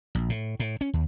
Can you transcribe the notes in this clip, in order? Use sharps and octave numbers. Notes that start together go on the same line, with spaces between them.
A#1
A2
A2
C#4
D#2